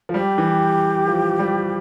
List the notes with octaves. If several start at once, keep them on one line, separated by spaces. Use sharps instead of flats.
F3
G3 G4
E3
F3
G3